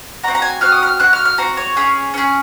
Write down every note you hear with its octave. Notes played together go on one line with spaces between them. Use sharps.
C4 F#4 A#5
A#5
G#5
C4 F#4 F6
D#6
F6
C4 F#4 F#6
F6
F6
C4 F#4 A#5
C#5
C#4 G#4
C#4 G#4